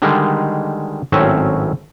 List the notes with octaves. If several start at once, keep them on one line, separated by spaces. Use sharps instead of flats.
D3 D#3 G3 G#3
G#1 A2 F#3 C4 C#4 E5